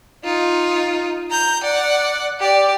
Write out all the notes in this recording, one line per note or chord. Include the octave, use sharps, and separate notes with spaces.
D#4 F4
A#5 G6
D5 F#5
G4 D5